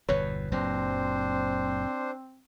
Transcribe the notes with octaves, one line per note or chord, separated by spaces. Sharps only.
G1 E2 B2 B4 C#5
F#1 A#2 F#3 C4 D4 C5